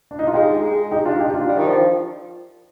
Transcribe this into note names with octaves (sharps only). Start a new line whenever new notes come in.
D4
D#4
F4
G#3 D#4 G4
G#3
D#4 G4
D4 F4
D#4 G4
D4 F4
G3
D#3
F3